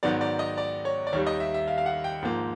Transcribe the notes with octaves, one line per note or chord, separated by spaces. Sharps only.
G#2 D#3 F#3 B3 D5
D5
D#5
D5
C#5
D5
D#2 D#3 G3 C#5
D#5
E5
E5
F5
F5
F#5
G5
G#2 F3 A#3